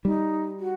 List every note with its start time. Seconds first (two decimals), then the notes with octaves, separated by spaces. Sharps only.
0.05 G3 D#4
0.59 F#4